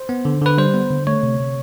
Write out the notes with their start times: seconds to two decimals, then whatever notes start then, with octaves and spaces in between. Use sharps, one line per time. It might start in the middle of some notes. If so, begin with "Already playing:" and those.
Already playing: C5
0.09 B3
0.25 D3
0.42 D3 B4
0.58 G3 C5
0.74 B3
0.90 D3
1.07 A3 C#5
1.23 C3
1.40 C3